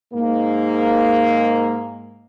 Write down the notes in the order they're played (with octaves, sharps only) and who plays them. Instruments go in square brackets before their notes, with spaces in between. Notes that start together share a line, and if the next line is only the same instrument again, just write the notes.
[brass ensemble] G#2 A#3